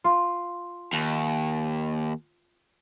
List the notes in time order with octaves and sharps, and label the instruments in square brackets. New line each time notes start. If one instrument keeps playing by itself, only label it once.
[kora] F4
[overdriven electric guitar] D#2